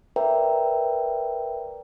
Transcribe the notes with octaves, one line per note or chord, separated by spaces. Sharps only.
A#4 B4 D5 E5 G5 A#5